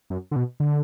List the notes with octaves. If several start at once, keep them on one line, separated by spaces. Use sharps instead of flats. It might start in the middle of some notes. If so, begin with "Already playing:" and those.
F#2
D3
B2
D3